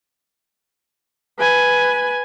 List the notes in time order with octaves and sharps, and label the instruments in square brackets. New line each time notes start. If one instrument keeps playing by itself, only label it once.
[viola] B4 G#5